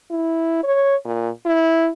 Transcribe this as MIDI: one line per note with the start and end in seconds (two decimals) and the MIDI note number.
0.11 0.63 64
0.64 0.95 73
1.05 1.29 46
1.46 1.89 64